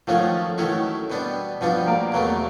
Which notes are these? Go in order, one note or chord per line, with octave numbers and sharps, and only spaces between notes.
D#3 F3 F#3 A3 C#4 F4 F#4
D#3 E3 F#3 A3 C#4 E4 F#4
B2 G3 B3 D4
B2 F3 G3 B3 D4 F4
A#3 A#4
E2 B2 F#3 A3